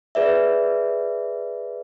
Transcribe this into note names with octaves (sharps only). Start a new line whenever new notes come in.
G#4 B4 D5 E5